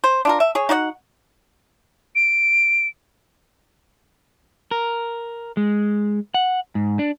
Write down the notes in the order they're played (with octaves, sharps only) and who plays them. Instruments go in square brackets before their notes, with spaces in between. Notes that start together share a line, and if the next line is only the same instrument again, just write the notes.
[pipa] C5
D4 F4 A#4
E5
G#4 C#5
D#4 F#4 D5 F#5
[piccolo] D7
[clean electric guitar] A#4
G#3
F#5
G#2
D4